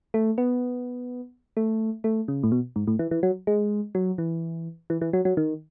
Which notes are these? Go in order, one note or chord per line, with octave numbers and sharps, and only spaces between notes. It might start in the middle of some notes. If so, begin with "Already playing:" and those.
A3
B3
A3
A3
C#3
A2
B2
G#2
A2
E3
E3
F#3
G#3
F#3
E3
E3
E3
F#3
F#3
D#3